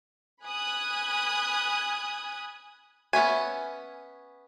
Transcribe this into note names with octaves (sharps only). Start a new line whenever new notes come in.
G#5 B5 D#6 F#6 G#6
B3 C#4 E5 G#5